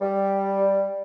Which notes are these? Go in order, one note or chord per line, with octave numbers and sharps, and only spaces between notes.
G3